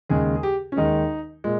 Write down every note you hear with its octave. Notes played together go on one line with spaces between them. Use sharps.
D#2 C#3 G#3 G#4
G#4
G4
C#4
D#2 D#3 G#3 D#4
A#2 G#3